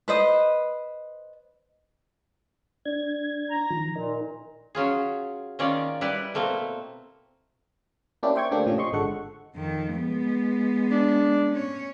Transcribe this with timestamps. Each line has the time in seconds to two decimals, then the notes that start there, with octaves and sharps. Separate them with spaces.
0.08 B4 C5 D#5
2.85 D4 G#6
3.50 A#5
3.70 D#3 F3
3.96 A#2 D#4 A#4
4.75 F#3 C#4 F4 G#4
5.59 D#3 A#3 C#4 F4 D5
6.01 G3 E4 B4 D5
6.34 B2 A3 A#3 C4
8.23 A#3 C#4 D4 E4 G4
8.35 C5 E5 G5 C#6 G#6
8.51 D3 A3 A#3 C4 D4 G4
8.66 A2 C3 F3 C#4 G4
8.78 D#5 C6 C#6
8.92 G#1 D3 G#3 A4 F#5 C#6
9.56 F2 D#3
9.93 G#3 B3
10.91 D4
11.52 C#4 C#5